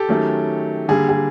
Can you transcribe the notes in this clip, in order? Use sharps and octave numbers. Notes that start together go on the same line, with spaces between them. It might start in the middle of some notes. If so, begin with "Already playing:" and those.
Already playing: G4 A4
D#3 F#3 A3 C#4
D3 G3 A#3 G#4
G#4